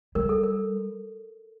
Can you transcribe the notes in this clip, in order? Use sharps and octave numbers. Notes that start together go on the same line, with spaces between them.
G3 A#4
A4
A#4